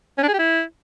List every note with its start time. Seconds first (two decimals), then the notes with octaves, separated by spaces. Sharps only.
0.18 C#4
0.23 D4
0.28 G#4
0.34 G4
0.39 E4